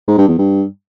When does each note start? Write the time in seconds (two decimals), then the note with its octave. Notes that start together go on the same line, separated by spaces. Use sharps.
0.08 G#2
0.18 G2
0.28 E2
0.38 G2